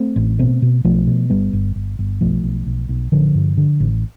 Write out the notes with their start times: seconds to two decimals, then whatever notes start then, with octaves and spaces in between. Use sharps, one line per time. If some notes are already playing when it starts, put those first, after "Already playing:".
Already playing: A3 C4
0.16 A1
0.39 B2 A3 C4
0.62 B2
0.84 B1 F3 A3
1.07 B2
1.30 G1 G3 B3
1.53 G1
1.76 G1
1.99 G1
2.21 B1 F3 A3
2.43 B1
2.66 B1
2.89 B1
3.12 A1 D3 F3
3.35 G2
3.57 D3
3.80 A1